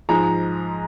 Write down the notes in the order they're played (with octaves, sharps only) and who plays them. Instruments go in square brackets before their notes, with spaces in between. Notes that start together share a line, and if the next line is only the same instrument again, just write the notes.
[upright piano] G#2 F3 G#3 A#5